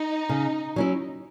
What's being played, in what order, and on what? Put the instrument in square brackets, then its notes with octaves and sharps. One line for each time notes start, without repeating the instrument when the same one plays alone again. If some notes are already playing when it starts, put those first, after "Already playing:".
Already playing: [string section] D#4
[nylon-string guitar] C#3
F#3 C#4 E4